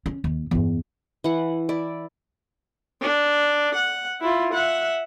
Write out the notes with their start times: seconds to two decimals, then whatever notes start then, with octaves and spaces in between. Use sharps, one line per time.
0.06 C#4
0.24 D#2
0.51 E2 G2
1.24 E3 F#5
1.69 E4 D5
3.02 D4
3.75 F#5
4.21 E4 F4
4.53 E5 F#5